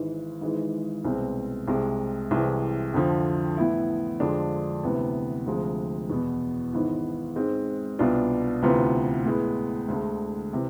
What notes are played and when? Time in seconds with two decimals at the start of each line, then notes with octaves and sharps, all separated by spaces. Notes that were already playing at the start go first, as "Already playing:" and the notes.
Already playing: G#1 G#2 E3
0.41 G#1 G#2 E3 G#3
1.05 C2 B2 G#3 C4
1.68 C2 C3 G#3
2.31 C2 C3 E3 G#3
2.94 F2 D3 F3
3.57 A2 E3 B3 E4
4.20 F2 D3 F3 G#3 D4
4.84 D2 C3 E3 B3
5.46 D2 C3 F3 G#3
6.10 E2 B2 B3
6.73 G#1 G#2 E3 B3
7.36 G#2 G#3 C4
7.99 C2 B2 B3 D4 F4
8.62 D2 C3 E3 B3 F4
9.25 A2 G#3 B3
9.88 D2 D3 G#3
10.53 C3 E3